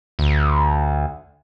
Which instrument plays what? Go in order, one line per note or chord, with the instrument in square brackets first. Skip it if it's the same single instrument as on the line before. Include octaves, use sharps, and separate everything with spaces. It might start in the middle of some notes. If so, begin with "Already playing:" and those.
[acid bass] D2